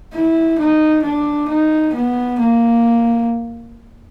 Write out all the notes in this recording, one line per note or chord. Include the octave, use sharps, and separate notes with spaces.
E4
D#4
D4
D#4
B3
A#3